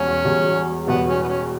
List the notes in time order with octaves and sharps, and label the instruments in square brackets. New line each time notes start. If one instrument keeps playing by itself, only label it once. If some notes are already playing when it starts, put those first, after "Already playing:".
Already playing: [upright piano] E1 E2 B2 G3 [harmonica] C#4
[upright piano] E1 E2 B2 G3
[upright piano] E1 E2 B2 G3 [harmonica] B3
[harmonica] C#4
B3
C#4